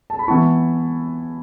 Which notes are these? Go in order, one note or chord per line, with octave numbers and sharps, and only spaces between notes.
A5
B5
E3 B3 E4 A5 C#6